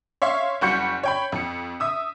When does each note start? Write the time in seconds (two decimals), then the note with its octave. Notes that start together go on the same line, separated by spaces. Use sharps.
0.22 C#5 E5 F5 C6 C#6
0.61 F#1 G3 F#4 C#6 G6 C#7
1.03 C#5 G5 B5
1.32 F2 C#7
1.80 E5 D#6 E6